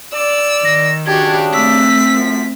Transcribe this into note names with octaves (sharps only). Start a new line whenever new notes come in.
D5 E6
D#3 A#6
C#3 D4 F#4 G4 G#6
A3 C4 E6 B6
F#2 F3